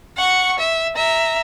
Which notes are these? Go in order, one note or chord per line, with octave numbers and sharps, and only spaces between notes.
F#5 C#6
E5
E5 A#5